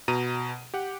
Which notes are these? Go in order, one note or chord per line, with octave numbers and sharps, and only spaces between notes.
B2 A#5 D#7
G4 F#5